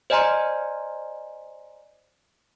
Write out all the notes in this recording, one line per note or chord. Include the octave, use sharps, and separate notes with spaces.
C5 D5 D#5 G#5 A#5 C6